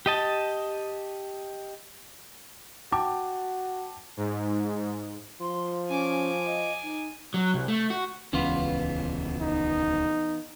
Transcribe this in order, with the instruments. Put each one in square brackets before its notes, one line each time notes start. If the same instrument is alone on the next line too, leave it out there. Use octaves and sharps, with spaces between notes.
[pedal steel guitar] G4 D#5 A5
[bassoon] F#4 [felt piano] G5 A5 D6
[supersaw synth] G#2
[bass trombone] F3 [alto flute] C6
[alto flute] C#4 [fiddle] G#5 D6
[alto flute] D#5
D#4
[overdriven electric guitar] F#3
C2
A3
F#4
[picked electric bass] D#1 C#2 C#4 [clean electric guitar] E3 B3 F4
[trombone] D#4